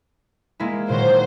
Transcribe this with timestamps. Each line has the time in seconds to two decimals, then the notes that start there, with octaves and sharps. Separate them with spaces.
0.60 G#3 A#3 E4
0.89 A#2 D#3 F#3 C5